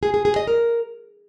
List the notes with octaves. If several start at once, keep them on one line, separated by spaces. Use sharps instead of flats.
G#4
G#4
G#4
D#5
A#4